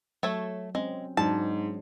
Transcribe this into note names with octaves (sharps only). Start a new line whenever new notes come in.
F#3 A3 A4 C#5
G#3 C4 C#4
G#2 F#3 G#3 D4 A5